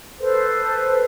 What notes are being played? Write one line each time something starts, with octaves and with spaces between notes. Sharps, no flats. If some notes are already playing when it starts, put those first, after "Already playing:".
A4 B4 C5